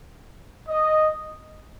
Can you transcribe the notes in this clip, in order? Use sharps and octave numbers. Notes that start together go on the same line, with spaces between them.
D#5